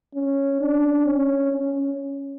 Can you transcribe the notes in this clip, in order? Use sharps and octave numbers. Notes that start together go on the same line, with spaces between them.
C#4
D4
C#4
C#4